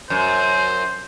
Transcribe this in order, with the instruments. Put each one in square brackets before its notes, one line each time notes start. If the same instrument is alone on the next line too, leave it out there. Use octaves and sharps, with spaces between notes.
[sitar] F#2 [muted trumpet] C5